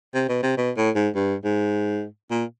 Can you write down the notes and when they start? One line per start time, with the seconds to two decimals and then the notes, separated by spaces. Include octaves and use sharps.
0.14 C3
0.29 B2
0.43 C3
0.57 B2
0.77 A2
0.95 G#2
1.15 G2
1.44 G#2
2.31 A#2